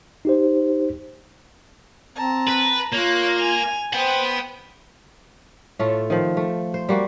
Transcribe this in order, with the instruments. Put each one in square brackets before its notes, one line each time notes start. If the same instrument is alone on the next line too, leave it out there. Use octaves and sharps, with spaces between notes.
[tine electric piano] D#4 G4 C5
[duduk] C4 [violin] A5 A#5
[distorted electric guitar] B4
[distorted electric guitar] A#3 [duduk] F4 [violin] C#5 F#6
[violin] G#5 F7
[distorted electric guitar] B4 F#5 [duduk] C5 [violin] G5 D#6
[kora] A2 A3 F4 A4
D#3 F3
A3
C5
G3 A#3 F#4